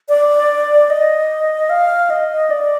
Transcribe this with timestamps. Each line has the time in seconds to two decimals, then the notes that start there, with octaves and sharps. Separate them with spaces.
0.09 D5
0.90 D#5
1.70 F5
2.10 D#5
2.50 D5